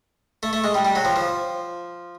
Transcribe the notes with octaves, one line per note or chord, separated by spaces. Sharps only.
A3
A3
G#3
G3
G3
F#3
F3
F3